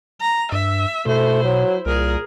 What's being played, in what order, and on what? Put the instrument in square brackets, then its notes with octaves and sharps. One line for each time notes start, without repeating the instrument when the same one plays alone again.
[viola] A#5
[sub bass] G2 [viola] E5
[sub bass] B2 [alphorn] A3 [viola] E4 C5
[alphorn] F#3
[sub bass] C2 [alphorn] A#2 [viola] G#4 A#4